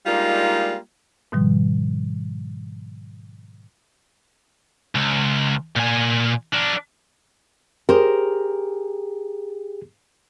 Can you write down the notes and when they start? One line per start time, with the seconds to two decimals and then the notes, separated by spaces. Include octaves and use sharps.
0.06 G3 G#3 A#3 D4 D#4 F4
1.32 G#2 B2 D#3 F3 G3
4.95 C#2
5.76 A#2 G#5
6.54 D4 A#4
7.89 G4 G#4 A#4 C5